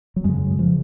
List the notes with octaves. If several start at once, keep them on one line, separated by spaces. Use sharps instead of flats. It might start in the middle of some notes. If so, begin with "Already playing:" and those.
F#3
F#2 C#3 G#3
C#3 F3